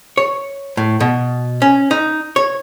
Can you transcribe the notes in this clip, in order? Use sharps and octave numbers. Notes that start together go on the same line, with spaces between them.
C#5
A2
B2
C#4
D#4
C#5